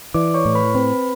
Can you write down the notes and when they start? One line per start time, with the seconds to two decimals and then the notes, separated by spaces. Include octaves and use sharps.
0.14 E3 D5 D6
0.34 C#5 C#6
0.45 A2
0.54 B4 B5
0.74 C4 B4 B5